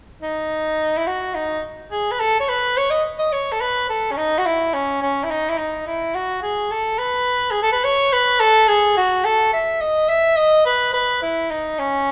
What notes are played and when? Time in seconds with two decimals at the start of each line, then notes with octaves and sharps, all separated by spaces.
0.22 D#4
0.97 E4
1.07 F#4
1.35 D#4
1.91 G#4
2.11 B4
2.20 A4
2.40 C#5
2.49 B4
2.77 C#5
2.90 D#5
3.18 D#5
3.32 C#5
3.52 A4
3.60 B4
3.90 A4
4.11 C#4
4.17 D#4
4.38 F#4
4.46 E4
4.73 C#4
5.02 C#4
5.24 E4
5.30 D#4
5.49 E4
5.58 D#4
5.87 E4
6.15 F#4
6.43 G#4
6.71 A4
6.99 B4
7.51 G#4
7.62 A4
7.72 B4
7.84 C#5
8.13 B4
8.40 A4
8.68 G#4
8.97 F#4
9.25 A4
9.53 E5
9.81 D#5
10.09 E5
10.37 D#5
10.66 B4
10.93 B4
11.22 E4
11.50 D#4
11.79 C#4